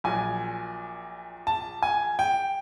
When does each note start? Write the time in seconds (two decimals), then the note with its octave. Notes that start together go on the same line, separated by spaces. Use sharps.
0.04 A#1 A#2 F#3 G#5
1.47 A5
1.82 G#5
2.19 G5